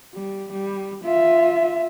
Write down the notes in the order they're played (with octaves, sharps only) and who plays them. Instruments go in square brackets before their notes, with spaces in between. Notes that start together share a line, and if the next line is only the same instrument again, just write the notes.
[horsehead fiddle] G3
G3
F4 E5